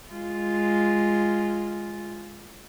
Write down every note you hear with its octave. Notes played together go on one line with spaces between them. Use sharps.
G#3 F4